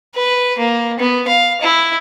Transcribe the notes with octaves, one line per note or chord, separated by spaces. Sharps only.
B4
A#3
B3
F5
E4